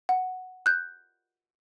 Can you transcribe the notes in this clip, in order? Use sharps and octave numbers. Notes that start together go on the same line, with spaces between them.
F#5
F#6 G6